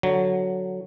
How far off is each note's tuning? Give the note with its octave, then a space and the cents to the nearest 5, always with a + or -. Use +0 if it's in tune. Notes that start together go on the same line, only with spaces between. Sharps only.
D3 +0 F#3 +0